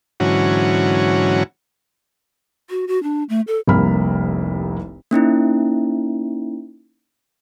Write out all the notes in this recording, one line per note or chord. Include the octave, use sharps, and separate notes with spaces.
G#2 D3 E3 F#3 C#4 F#4
F#4
F#4
D4
A3
A4
F1 C2 A#3 B5 F6
A#3 C#4 D#4 E4